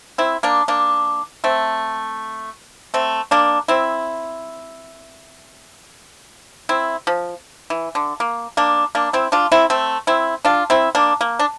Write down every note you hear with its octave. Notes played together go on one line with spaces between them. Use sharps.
C4 E4
A#3 D4
A#3 D4
A3 C4
A3 C4
A#3 D4
C4 E4
C4 E4
F3
E3
D3
A#3
A#3 D4
A#3 D4
C4 E4
D4 F4
C4 E4
A3 C4
C4 E4
D4 F4
C4 E4
A#3 D4
A#3
D4